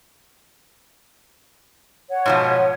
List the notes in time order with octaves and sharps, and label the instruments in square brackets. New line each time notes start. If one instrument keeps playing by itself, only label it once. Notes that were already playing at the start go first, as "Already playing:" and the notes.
[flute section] C#5 F#5
[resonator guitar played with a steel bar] G#2 B2 F3